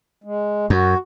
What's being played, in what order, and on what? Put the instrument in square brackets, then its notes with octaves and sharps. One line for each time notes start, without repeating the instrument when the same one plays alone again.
[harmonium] G#3
[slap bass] F#2 [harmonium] F#4